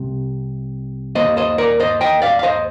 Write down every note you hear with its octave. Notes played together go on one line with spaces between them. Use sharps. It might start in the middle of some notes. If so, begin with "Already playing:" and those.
Already playing: C2 C3
D#2 D#3 A#3 C5 D#5
C5 D#5
A#4 D5
C5 D#5
D#5 G5
D5 F5
F5
C5 D#5